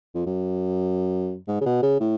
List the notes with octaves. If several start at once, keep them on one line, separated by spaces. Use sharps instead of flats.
F2
F#2
G#2
C#3
B2
C#3
A2